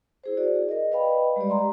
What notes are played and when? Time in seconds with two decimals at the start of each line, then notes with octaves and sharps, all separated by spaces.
0.24 E4 G#4 C5
0.37 F#4 G#4 D5
0.69 A#4 D#5
0.92 B4 D5 D#5 F5 G5 B5
1.36 G3 G#3 G4 D5
1.50 A#5 C6